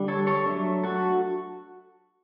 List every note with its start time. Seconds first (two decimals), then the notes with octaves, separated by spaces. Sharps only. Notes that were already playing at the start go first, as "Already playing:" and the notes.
Already playing: D3 G3 D4
0.08 A4 C#5
0.27 A4 C#5
0.46 F#3 A3 D4
0.84 F#4 A4